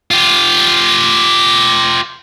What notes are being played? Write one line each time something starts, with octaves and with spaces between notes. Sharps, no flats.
F4 G4